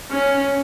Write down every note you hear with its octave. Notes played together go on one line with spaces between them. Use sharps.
C#4